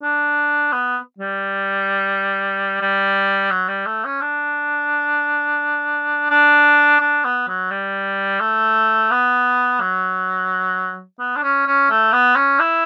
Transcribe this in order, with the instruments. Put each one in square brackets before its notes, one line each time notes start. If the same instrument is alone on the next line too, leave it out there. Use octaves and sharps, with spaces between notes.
[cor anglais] D4
B3
G3
G3
F#3
G3
A3
C#4
D4
D4
D4
B3
F#3
G3
A3
B3
F#3
B3
D4
C#4
C#4
A3
B3
C#4
E4